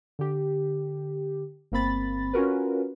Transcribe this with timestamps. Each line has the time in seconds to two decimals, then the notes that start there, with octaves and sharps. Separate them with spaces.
0.19 D3 G4
1.72 G1 A#3 C4 B5 A6
2.33 C#4 F4 F#4 A#4 B4